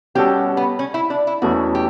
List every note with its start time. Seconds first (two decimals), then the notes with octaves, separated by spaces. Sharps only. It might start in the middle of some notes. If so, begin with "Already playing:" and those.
0.15 B2 G3 C#4 F#4 G4 A4
0.57 B3
0.79 C#4
0.94 E4
1.10 D4
1.27 E4
1.42 E2 B2 A3 C#4 F#4
1.75 G4